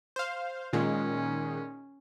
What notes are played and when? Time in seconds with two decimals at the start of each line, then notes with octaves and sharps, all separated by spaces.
0.16 C5 F5
0.73 A#2 D#3 G#3 C#4